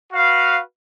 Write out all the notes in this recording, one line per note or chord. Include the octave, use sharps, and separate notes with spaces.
F#4 B4 F5